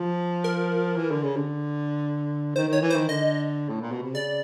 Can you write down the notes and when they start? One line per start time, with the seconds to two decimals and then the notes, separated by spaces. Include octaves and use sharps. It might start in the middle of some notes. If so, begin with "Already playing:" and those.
Already playing: F3
0.44 A#4
0.96 E3
1.11 D3
1.23 C#3
1.36 D3
2.56 D#3 C5
2.68 D#3 C#5
2.82 E3
2.90 C5
2.95 D#3
3.09 D3 D#5
3.69 A2
3.81 A#2
3.92 B2
4.03 C3
4.14 C#3 D5